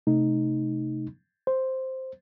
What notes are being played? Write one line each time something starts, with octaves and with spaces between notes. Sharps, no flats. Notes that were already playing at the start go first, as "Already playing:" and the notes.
C3 A3 D#4
C5